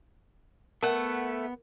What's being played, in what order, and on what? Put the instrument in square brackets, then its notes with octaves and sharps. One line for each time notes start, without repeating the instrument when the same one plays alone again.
[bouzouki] A3 F#5 [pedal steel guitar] B3 [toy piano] A#4